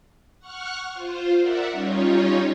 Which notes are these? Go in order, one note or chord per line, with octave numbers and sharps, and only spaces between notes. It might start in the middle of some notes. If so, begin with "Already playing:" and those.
F#5 C#6 F6 F#6
F4 C5
A#4 D5 E5 F#5
G3 C#4 D#4 F4 C#5